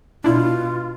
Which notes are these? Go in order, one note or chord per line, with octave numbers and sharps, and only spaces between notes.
B2 D4 E4 F4